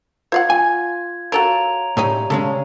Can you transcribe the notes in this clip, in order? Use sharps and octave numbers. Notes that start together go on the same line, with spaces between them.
F4 C5 F5 F#5 G#6
G#5
F#4 A4 A#4 C#5 F5 A#5 D7 F7
A2 G3 G#3 C#4 D#4
C#3 G#3 C#4 A4